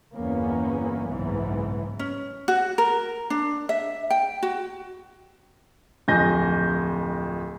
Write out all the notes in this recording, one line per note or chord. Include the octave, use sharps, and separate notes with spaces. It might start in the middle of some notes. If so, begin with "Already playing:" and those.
G1 E2 A#3 B3 C#4
F#1 B1 G#2 E3 B3
C#4
F#4
A#4
D4
E5
G5
F#4
D1 F2 D#5 G#5 G6 A#6